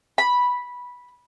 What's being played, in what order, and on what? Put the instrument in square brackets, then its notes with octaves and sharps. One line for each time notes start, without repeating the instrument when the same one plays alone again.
[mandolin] B5